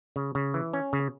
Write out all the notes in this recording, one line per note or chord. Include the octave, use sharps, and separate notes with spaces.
C#3
C#3
E3
C#4
C#3